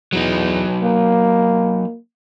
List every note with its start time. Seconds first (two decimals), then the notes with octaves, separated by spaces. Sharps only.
0.13 E2 F#3 D#4
0.83 A#3